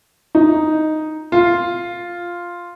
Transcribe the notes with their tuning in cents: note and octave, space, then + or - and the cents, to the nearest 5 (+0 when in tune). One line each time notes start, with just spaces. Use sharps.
D#4 +0
F4 +0